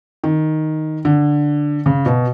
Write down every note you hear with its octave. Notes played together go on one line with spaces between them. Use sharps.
D#3
D3
C#3
B2